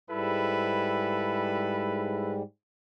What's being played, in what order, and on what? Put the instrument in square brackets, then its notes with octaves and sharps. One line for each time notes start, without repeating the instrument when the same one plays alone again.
[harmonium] G#2 G3 [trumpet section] E4 A4 B4